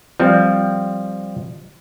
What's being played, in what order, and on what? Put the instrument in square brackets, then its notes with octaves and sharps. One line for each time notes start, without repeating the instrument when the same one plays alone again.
[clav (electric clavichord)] F3 G3 C4